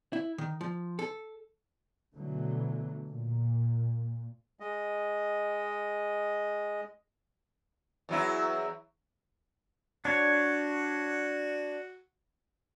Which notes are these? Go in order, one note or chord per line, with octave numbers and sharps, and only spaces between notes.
E4
D#3
F3
A4
B2 D3 E3 F#3 A3
A#2
G#3 D#5
E2 F#3 E4
D4 F#4 C#5